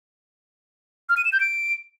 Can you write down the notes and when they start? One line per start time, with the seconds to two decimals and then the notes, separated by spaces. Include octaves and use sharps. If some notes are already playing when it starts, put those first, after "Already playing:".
1.09 F6
1.17 D#7
1.25 E7
1.33 G6
1.40 D7